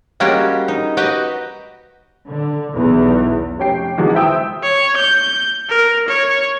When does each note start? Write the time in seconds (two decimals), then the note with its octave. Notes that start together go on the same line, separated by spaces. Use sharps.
0.20 G3 G#3 A#3 C#4 F#4 G4
0.68 D#4
0.97 F#4 G4 B4 D#5 F#5 G5
2.27 D3
2.71 B1 E2
3.59 F1 C#4 G4 G5 C7
3.98 E2 B2 D3 D#3 F#3 G#3
4.14 E4 C5 E5 G5 D#6 E6
4.63 C#5
4.97 G6
5.69 A#4
6.08 C#5